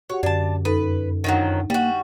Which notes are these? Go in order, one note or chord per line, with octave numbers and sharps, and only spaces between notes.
F#4 G4 C#5 F#5
F#2 D3 D4 A5 G#6
F2 D#4 A4 B4
D#3 F3 F#3 D4 D#4 F#5
G3 A#3 F#4 G5